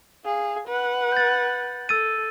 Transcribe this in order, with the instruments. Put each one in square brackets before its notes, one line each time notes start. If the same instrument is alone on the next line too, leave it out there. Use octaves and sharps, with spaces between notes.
[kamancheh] G#4 F5
B4 F#5
[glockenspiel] G6 A6
[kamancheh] A4 [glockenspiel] E6 A6 D#7